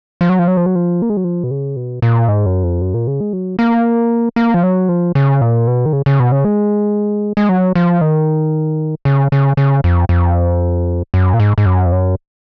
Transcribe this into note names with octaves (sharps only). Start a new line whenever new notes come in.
F3
F#3
F3
F#3
F3
F#3
F3
A#3
G#3
F#3
F3
B2
C#3
B2
A#2
G#2
F#2
F2
F#2
A#2
C#3
G#3
F#3
A#3
A#3
F3
F#3
F3
C#3
A#2
B2
D#3
C#3
C#3
B2
C#3
G#3
G#3
F#3
F3
D#3
C#3
C#3
C#3
F2
F2
F#2
A#2
G#2
G#2
F#2
F2
F#2